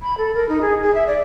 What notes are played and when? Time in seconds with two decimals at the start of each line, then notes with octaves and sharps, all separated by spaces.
0.01 B5
0.18 A4
0.35 A#4
0.49 D#4
0.61 G#4
0.83 G#4
0.95 E5
1.07 D5